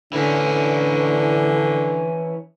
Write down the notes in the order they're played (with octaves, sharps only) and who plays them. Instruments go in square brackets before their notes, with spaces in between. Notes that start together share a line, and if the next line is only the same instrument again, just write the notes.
[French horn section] A2 D4 [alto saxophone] D3 [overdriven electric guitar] E3 C#4